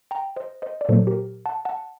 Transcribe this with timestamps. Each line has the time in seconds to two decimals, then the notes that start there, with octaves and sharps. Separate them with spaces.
0.11 G5 A#5
0.36 C5 D#5
0.62 C5 D#5
0.81 D5
0.89 A#2 F#3 A#3 A4 C5
1.07 G4 A#4
1.46 F#5 A5
1.65 F#5 A5